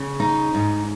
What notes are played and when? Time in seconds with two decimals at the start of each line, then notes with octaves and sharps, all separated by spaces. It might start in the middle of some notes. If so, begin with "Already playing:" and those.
Already playing: C#3
0.20 D#4
0.55 G#2